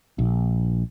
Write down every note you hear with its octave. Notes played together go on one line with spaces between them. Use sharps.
A#1